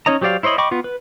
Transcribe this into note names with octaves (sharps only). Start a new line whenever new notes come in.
C#4 D#4 C#5 D#5 A#5
F#3 G4 C5 D5 F5
E4 C5 C#5 D#5 B5
D#5 G5 B5 C#6 D6
B3 F4
B4